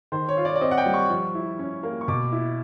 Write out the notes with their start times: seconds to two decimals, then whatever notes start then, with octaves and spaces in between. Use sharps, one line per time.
0.12 D#3 C5
0.29 C#5
0.37 F4
0.45 D5
0.55 D5
0.61 C4 D#5
0.71 F#5
0.78 G5
0.86 G3
0.94 C#6
1.10 F3
1.35 E4
1.59 C#4
1.83 A#3
2.01 C#6
2.08 B2 D6
2.32 E4